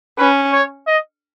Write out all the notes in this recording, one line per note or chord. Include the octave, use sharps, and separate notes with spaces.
C#4 B4
C#5
D#5